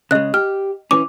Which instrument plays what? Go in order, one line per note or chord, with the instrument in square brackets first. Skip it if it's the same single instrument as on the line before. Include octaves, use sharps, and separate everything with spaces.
[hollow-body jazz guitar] C#3 G#3 [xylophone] D#5 F#6
[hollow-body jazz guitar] G4 [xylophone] F6
[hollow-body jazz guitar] E3 C#4 [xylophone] D6